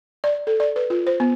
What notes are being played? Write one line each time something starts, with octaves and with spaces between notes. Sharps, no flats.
D5
A4
D5
B4
F4
C5
B3